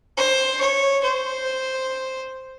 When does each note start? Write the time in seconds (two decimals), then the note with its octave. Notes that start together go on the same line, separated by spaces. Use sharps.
0.17 C5
0.61 C#5
1.04 C5